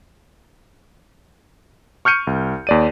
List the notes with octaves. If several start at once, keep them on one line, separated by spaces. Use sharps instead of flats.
C#6 F6 G6 C#7 D#7
C2
D#2 D5 D#7